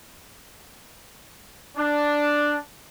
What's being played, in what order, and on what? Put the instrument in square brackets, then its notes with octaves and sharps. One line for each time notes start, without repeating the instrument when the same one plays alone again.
[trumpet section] D4